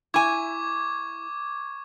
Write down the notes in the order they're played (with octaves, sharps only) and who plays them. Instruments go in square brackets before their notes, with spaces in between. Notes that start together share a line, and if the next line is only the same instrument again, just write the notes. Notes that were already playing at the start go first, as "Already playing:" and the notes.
[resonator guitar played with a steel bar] E4 G#5 [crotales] C#6 D6 G#6